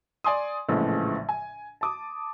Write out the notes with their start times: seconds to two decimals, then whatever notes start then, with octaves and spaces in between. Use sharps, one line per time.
0.24 D5 G#5 C6 D#6
0.69 A#1 A2 C#3 E3 F3 G#3
1.29 G#5
1.81 A5 D6 D#6